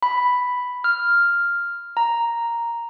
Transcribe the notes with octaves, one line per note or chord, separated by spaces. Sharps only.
B5
F6
A#5